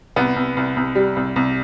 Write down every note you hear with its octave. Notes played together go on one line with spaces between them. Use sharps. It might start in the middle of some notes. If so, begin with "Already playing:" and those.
C2 B3
C2
C2
C2
G3
C2
C2